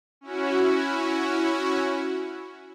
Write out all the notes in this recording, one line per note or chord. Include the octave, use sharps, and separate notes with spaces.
C#4 E4 F#4